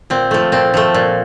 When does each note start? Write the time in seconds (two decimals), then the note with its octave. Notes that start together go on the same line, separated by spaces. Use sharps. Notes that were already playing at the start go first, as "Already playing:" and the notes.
0.10 A#2 C4
0.31 F3 A3
0.52 A#2 C4
0.74 F3 A3
0.94 A#2